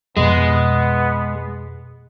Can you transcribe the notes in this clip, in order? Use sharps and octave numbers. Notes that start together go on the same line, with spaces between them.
F2 B2 G#3 B3